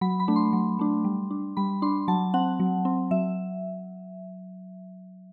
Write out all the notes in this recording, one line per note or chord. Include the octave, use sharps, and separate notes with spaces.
F#3 B5
B5
A3 D4
C6
F#3
A3 D4
G3
D4
G3 B5
D4 C6
F#3 A5
C4 F#5
F#3
C4
F#3 E5